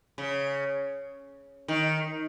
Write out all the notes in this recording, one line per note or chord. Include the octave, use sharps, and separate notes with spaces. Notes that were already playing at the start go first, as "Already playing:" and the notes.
C#3
D#3